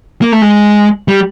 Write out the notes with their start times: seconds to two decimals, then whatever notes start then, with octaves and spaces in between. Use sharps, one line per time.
0.21 A#3
0.32 A3
0.42 G#3
1.08 G3